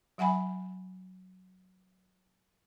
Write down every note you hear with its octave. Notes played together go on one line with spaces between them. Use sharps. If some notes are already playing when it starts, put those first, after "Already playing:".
F#3 E5 F#5 G#5 B5